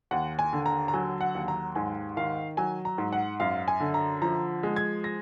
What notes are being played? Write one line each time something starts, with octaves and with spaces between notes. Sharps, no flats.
D#2 F#5
G#5
D3
A#5
A#5
F#3 G#5
F#5
D#2
A#5
G#2 G#5
D#3 F5
F#3 G#5
A#5
G#2
F#5
F#2 F5
G#5
D3
A#5
F3 A#5
G#3
G#6
A#6